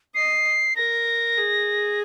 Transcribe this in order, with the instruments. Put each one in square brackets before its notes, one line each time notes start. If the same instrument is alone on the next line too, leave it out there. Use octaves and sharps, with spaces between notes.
[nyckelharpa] D#5 [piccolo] C7
[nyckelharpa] A#4 [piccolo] A#6
[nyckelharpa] G#4